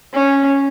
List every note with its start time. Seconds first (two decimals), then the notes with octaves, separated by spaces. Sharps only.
0.14 C#4